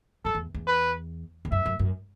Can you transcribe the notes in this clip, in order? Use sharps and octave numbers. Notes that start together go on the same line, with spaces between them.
F#2 A4
E2
E2
B4
E2
F#2 E5
F#2
F#2